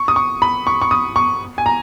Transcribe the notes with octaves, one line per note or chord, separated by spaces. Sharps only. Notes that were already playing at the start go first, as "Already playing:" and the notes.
Already playing: C#6
D#6
C#6
B5
C#6
C#6
D#6
C#6
G#5
A#5